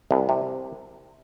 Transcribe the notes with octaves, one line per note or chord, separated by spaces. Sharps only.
C2
C3